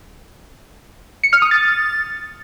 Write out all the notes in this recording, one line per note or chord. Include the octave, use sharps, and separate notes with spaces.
C#7
F6
D#6
A6